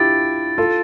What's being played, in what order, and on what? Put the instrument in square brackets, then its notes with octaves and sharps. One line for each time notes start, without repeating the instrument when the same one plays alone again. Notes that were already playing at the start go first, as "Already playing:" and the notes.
Already playing: [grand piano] D4 E4 F4 G4 [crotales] A6 D7
[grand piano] F4 A4